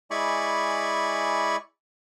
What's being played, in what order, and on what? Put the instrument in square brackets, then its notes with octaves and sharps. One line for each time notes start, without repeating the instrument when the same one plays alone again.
[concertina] G#3 E4 D5 G#5 B5 C#6